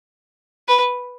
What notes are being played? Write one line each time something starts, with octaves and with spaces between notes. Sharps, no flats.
B4